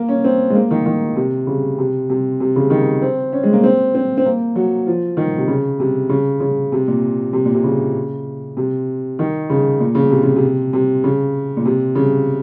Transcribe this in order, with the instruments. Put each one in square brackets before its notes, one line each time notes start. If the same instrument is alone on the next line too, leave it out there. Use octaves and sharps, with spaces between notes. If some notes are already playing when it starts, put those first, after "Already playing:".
Already playing: [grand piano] A#3
C#4
C4
G#3
A#3
D#3
D#3
C3
C#3
C3
C3
C3
C#3
D#3
C4
C#4
G#3
A#3
C4
C4
C4
A#3
F#3
F3
D#3
C3
C#3
C3
C#3
C#3
C3
A#2
C3
A#2
C3
C#3
C3
D#3
C#3
A#2
C#3
C3
C#3
C3
C3
C#3
A#2
C3
C#3